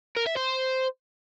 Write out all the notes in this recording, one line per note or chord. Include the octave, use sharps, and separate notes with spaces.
A#4
E5
C5